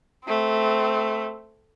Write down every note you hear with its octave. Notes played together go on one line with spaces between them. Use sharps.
A3 C4